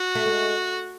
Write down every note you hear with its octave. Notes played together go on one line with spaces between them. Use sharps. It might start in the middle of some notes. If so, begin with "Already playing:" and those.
Already playing: F#4
A3
G#3